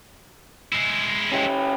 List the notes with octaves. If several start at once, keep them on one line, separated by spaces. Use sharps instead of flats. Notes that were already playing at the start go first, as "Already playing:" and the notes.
G#3 E4
C#4 G4